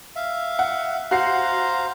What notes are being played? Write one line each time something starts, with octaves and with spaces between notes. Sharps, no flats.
E5 F5
F#5
F#4 C5 F5 A#5 C7